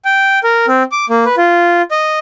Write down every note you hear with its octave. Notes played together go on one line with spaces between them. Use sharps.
G5
A#4
C4
D6
A#3
B4
F4
D#5